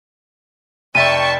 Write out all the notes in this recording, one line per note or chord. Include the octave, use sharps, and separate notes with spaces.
F1 D5 E5 G5 A5 C#6 D#7